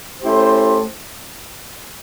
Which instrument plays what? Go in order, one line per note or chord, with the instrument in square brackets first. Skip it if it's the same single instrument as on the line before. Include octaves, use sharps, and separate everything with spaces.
[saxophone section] A3 C#4 E4 G4 C5